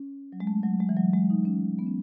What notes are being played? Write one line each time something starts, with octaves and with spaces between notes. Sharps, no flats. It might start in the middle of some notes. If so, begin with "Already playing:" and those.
Already playing: C#4
F#3
G#3
A3
F#3
G#3
E3
F#3
G#3
D#4
C#4
B3
C#4